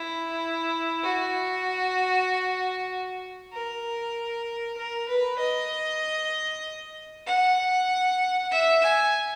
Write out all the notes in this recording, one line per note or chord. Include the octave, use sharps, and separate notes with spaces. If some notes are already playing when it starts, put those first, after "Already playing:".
Already playing: E4
F#4
A#4
A#4
B4
D#5
F#5
E5
G#5